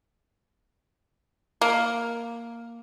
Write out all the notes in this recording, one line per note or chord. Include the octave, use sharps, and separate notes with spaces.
A#3